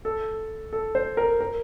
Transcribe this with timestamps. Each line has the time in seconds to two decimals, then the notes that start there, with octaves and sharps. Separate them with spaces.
0.05 A4
0.73 A4
0.95 C5
1.17 A#4
1.41 A#4